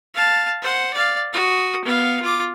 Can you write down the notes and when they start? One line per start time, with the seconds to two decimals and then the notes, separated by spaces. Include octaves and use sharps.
0.14 F5 A5
0.62 C5 F#5
0.93 D5 F5
1.33 F#4 D#6
1.84 B3 F5
2.22 F4 D6